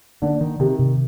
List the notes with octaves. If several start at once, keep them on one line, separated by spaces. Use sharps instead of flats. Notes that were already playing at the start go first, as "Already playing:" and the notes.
D3 A#3
D#3
C3 D#3
C3